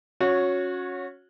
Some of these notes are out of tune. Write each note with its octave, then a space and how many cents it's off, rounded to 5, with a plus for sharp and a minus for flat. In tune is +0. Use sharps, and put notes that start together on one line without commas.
C#4 +0 F#4 -25 C#5 +0